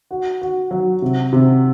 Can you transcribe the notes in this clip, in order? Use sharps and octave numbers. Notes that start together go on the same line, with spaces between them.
F#4
F#4
F#3
C3
C3